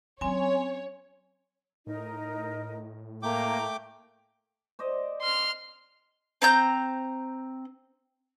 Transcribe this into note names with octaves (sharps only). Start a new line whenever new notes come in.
F#3 C4 C#4 C#5 G#5
A2 D#4 A#4 D#5
A3 A#3 G5 G#5 A#5 D6
C5 D5 D#5
C6 F6
C4 A#5 G6